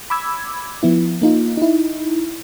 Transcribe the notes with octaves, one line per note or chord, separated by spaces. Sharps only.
B5 D6 E6 G#6
F3 B3 E4
A#3 D#4 F4
D#4 E4